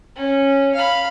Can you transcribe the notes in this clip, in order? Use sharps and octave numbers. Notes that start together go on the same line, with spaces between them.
C#4
F5 B5